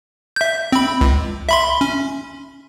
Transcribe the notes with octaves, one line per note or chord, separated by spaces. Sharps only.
E5 G6
C4 B5
C#2
E5 B5 C6
C#4